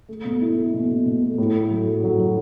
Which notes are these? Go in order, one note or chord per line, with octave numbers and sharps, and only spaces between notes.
A3
B2
E4
A3
B2
B2
B2
A3
A2
A3
F#3
A3
F#3
F#3